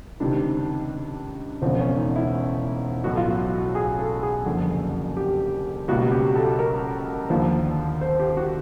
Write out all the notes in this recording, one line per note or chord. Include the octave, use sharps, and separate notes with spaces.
C#2 C3 D#3 D4
E1 E2 C#3 F3 C4
C#4
D#4
E4
B1 A2 E3 F#4
F4
F#4
G#4
A4
G#4
F#1 F2 D3
G4
C#2 B2 G3 A#3 F#4
G4
A4
A#4
D#2 D3 F3 A#3
C5
G4
G4
F#4